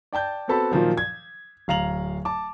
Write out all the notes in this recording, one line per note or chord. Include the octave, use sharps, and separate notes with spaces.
D5 G5 A5 G6
B3 C4 F#4 A4 A5 B5
A#2 D#3 F3 F#3
G#6
D1 F5 A#5 F7 F#7
A5 D6